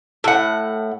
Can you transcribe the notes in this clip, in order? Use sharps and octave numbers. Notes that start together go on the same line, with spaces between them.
A2 F#5